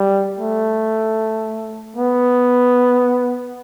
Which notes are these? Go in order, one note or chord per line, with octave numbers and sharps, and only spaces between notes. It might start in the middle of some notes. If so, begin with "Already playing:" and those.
Already playing: G3
A3
B3